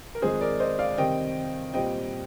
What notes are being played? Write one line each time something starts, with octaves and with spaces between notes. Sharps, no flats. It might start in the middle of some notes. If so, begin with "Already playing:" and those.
A#4
F2 D#3 G#3 G#4 C5
A#4 D5
C5 D#5
D5 F5
C3 D#3 G3 C4 D#5 G5
A#2 G3 C4 D#5 G5